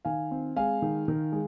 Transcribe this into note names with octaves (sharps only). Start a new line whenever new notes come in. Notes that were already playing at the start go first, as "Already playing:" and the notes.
D#3 F5 G#5
C4
G#3 F5 G#5
D#3
D#3
G#3